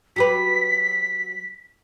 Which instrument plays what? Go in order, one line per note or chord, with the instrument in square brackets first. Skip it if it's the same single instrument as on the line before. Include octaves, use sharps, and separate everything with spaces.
[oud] F#3 G4 B4 [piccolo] B6